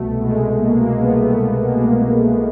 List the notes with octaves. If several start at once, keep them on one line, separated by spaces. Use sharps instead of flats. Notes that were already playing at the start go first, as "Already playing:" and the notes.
Already playing: C2 B2 A3
B2 G#3
A3
B2 G#3 A#3
G#3 A#3
C2 A3 B3
A3 B3
C2 A3
G#3 A#3
C2 G#3 A#3
C2